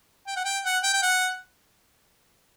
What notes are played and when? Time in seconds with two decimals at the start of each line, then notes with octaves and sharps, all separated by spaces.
0.27 G5
0.36 F#5
0.45 G5
0.65 F#5
0.83 G5
0.93 G5
1.03 F#5